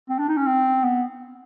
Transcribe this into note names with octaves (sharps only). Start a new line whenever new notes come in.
C4
D4
D#4
C#4
C4
B3